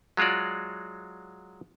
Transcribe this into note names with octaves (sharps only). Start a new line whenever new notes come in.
F#3 G#3 F4 F#4 D5